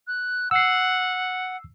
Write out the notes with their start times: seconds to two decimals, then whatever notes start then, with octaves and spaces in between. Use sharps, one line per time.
0.07 F#6
0.51 F#5 E6 C7